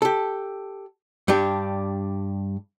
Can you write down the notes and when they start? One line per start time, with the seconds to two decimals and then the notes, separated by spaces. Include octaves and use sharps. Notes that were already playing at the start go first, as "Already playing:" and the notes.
0.02 G4 A4
1.28 G2 G3 D4 G4